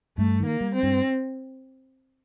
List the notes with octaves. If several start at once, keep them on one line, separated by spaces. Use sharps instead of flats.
G2 A3
D#3
A#3
G3
C4
G2